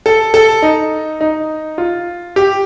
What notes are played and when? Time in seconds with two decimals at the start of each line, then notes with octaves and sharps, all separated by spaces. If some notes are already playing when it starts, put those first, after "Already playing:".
0.06 A4
0.34 A4
0.62 D#4
1.21 D#4
1.78 F4
2.36 G4